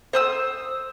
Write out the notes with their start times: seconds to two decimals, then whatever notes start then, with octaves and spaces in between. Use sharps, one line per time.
0.13 C5 D#6 E6